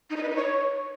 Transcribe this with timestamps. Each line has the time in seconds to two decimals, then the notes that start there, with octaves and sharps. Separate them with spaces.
0.10 D#4
0.17 D#5
0.23 B4
0.29 D#4
0.36 C#5